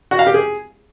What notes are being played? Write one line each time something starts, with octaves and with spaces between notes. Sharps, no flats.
F#4
F5
G4
G#4